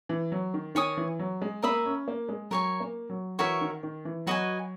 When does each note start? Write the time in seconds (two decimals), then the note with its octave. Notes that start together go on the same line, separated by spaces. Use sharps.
0.09 E3
0.32 F#3
0.54 D#3
0.75 D#3 C#5 G#5 D#6
0.97 E3
1.19 F#3
1.42 G#3
1.62 A#3 A#4 E5 B5 D#6
1.86 C#4
2.08 A#3
2.29 G#3
2.51 F#3 A#4 C#5 G#5 C#6
2.80 A#3
3.10 F#3
3.39 E3 F#4 A#4 C#5 E5
3.61 D#3
3.83 D#3
4.05 E3
4.27 F#3 F#4 B4 D#5 G#5